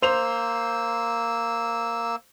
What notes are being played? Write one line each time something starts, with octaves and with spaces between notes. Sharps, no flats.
A#3 C5 E6 F7